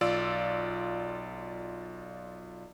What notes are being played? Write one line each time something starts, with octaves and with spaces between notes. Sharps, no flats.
B1 F4 D5 E6